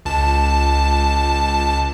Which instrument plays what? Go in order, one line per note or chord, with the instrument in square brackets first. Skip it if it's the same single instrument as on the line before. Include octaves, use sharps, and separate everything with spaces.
[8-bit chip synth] C#2 A5